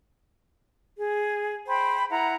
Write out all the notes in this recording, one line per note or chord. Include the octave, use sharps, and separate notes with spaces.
G#4
C5 G5 B5
E4 F#5 A#5